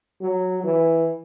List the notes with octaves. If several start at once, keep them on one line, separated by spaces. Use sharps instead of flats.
F#3
E3